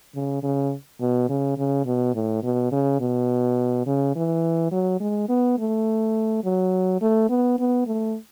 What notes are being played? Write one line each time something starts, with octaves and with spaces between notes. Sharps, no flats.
C#3
C#3
B2
C#3
C#3
B2
A2
B2
C#3
B2
C#3
E3
F#3
G#3
B3
A3
F#3
A3
B3
B3
A3